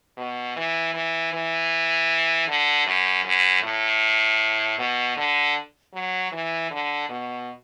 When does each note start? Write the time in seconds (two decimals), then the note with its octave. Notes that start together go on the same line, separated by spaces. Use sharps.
0.17 B2
0.56 E3
0.94 E3
1.33 E3
2.48 D3
2.86 F#2
3.25 F#2
3.63 A2
4.78 B2
5.17 D3
5.94 F#3
6.32 E3
6.71 D3
7.09 B2